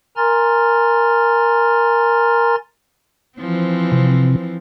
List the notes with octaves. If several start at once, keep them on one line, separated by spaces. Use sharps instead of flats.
A#4 G#5 A#5 C6 F6 A6
E3 F3 C4
C3